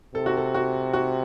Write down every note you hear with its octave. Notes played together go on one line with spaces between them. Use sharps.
C3 A4
F#4
A4
F#4
F#4